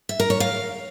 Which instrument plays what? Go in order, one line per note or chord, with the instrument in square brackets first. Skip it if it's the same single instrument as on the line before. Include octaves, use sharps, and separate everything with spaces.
[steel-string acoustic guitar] E5
A#4
C#5
F5